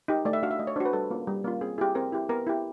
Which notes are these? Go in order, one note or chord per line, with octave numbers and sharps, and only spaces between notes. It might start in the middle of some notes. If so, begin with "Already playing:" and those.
D#4 G4
A3 D5
E5
D4 F#4 F5
E5
A3 D#5
C#5
D4 F#4 C5
B4
G3 A4
A#3 C#4 F4
G3
A#3 C#4 F4
C4 G#4
E4 G4 G#4
C4 A#4
E4 G4
B3 A#4
E4 G4